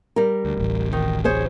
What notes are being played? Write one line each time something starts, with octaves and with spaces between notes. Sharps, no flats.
G3 A#4
D2
D1 A1
D#3
G#4 C5 C#5